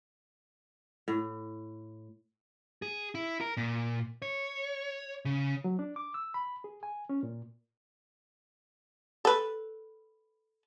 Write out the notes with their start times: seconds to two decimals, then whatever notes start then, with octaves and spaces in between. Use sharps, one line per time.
1.08 A2
2.82 G#4
3.15 E4
3.41 A#4
3.57 A#2
4.22 C#5
5.25 C#3
5.64 F#3
5.79 D4
5.96 D6
6.14 E6
6.34 B5
6.64 G#4
6.83 G#5
7.09 C#4
7.23 A#2
9.25 A4 B4